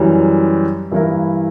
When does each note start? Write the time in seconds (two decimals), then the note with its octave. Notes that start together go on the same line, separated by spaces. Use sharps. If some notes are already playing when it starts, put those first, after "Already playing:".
Already playing: F#2 E3 G3
0.92 G2 E3 A#3 E4 A#4